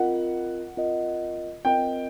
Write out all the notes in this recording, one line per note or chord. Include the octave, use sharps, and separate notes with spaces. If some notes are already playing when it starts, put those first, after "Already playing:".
Already playing: C4 F4 A#4 D#5 F#5
C4 F4 A#4 D#5
C4 F4 A#4 D#5 G5